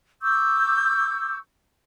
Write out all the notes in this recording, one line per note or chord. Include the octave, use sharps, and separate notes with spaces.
C#6 D6 E6 G6